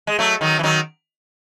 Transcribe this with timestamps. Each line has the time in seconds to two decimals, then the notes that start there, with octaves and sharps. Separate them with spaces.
0.07 G#3
0.19 F#3 A3
0.41 D#3 F#3
0.59 E3
0.63 D#3 F#3